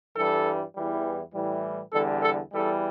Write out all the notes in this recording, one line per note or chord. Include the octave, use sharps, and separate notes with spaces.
G2 E3 G3 A4
E2 E3 G3
A2 E3 G3
E2 D3 G3 A4
A4
E2 E3 G3 A4